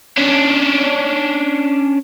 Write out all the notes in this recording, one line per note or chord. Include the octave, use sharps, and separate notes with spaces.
C#4 D4